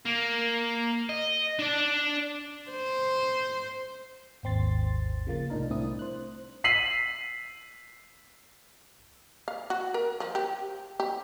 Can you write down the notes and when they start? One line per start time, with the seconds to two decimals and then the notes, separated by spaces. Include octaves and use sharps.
0.05 A#3
1.09 D#5
1.59 D4 D5
2.71 C5
4.43 G#1 D#2 C4 C6 A6
5.27 C#3 F3 A#3 A6
5.50 C2 A2 D4 D#4 A#4
5.70 C2 A2 C4 D4 E4 D#6
5.99 C5 F#6
6.64 E6 B6 C7 D#7 F#7
9.48 F5
9.70 F#4
9.94 A#4
10.20 F3
10.35 G4
11.00 G4